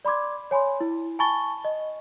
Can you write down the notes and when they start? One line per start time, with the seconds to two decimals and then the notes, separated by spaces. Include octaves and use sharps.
0.05 D5 B5 C6 D6 G#6
0.51 C#5 G#5 B5 C6
0.81 E4
1.19 G#5 A5 B5 C#6 A6 G7
1.65 D#5